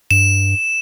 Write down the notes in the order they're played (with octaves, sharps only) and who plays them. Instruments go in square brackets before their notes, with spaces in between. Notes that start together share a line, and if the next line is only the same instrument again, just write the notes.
[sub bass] G2 [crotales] E7